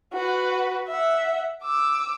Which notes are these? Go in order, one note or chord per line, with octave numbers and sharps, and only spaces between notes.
F#4 B4
E5 F#5
D6 E6